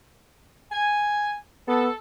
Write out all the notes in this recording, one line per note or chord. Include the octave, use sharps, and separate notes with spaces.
G#5
B3 A4